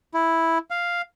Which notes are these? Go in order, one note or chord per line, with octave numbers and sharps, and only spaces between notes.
E4
F5